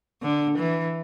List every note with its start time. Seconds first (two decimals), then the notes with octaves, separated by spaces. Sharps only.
0.23 D3
0.59 E3